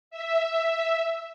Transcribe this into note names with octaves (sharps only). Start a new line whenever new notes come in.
E5